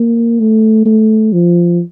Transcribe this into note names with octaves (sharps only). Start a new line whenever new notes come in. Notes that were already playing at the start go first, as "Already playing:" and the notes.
Already playing: A#3
A3
A3
F3